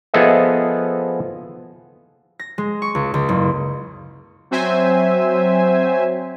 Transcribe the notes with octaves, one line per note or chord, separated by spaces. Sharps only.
F3 B3 G#4 A4 D#5 E5
A#6
G#3
C#6
C#2
C#2
F#1
F#3 C4 C5 E5 G#5